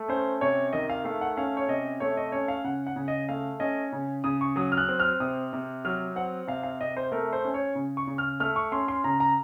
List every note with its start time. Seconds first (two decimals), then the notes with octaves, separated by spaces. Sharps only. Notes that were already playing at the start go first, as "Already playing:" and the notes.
Already playing: A3
0.08 C#4 C5
0.41 C3 C#5
0.73 D#3 D#5
0.89 F5
1.04 A3 F5
1.21 F#5
1.37 C#4 F5
1.57 C#5
1.68 C3 D#5
2.00 A3 C#5
2.17 D#5
2.32 C#4 C#5
2.48 F5
2.64 C#3 F#5
2.87 F#5
2.96 C#3
3.08 D#5
3.29 A3 F5
3.60 C#4 D#5
3.92 C#3
4.24 C#3 D#6
4.41 C#6
4.56 F#3 D#6
4.72 F6
4.77 F#6
4.88 C4
5.00 F6
5.20 C3 D#6
5.53 C3
5.85 F#3 F6
6.16 C4 F#5
6.48 C3 F5
6.63 F5
6.81 C3 D#5
6.97 C5
7.12 A3 A#4
7.33 C5
7.44 C#4
7.54 C#5
7.75 C#3
7.97 C#6
8.07 C#3
8.18 F6
8.40 A3 F6
8.56 C#6
8.72 C#4 C6
8.88 C6
9.04 C#3 A#5
9.20 A#5